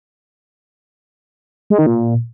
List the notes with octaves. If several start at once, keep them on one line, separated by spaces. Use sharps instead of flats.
G#3
D#3
A#2